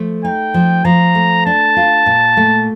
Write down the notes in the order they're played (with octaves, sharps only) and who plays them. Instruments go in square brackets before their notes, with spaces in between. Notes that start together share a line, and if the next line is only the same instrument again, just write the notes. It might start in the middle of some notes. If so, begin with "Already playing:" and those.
Already playing: [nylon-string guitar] F3 A3
[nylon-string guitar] D#4 [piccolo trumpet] G5
[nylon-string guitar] F3
[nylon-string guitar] F3 [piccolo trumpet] A#5
[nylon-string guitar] A3
[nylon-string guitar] D4 [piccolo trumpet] A5
[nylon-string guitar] F4
A#2
A3